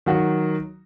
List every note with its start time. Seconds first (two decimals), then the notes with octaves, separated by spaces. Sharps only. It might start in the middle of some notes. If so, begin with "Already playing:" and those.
0.06 D#3 F#3 F#4